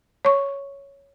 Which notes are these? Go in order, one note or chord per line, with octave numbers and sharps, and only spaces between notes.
C#5 C#6